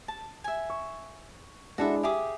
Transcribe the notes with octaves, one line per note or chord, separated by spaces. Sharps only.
A5
E5 G#5
C#6
G#3 D4 E4 F#4 A4 E5
G4 G#4 E5 D6